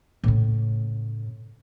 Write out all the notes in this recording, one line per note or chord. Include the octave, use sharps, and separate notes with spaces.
A2 C#3